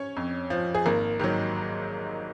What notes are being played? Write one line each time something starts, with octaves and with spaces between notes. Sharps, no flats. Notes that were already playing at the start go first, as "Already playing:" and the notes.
Already playing: C#4 C#5
F2
F3
G#4
G#1 A#3 A#4
G#2 D#3 F#3